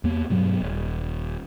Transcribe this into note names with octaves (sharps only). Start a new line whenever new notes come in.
E2 A#3
G2 B2 F#3
D#1